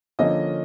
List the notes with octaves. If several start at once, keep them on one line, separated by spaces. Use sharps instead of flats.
D3 F3 A#3 C#4 D#5